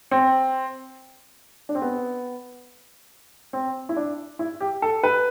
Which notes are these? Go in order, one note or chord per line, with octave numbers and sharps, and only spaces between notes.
C4
D4
C4
B3
C4
E4
D4
E4
G4
A4
B4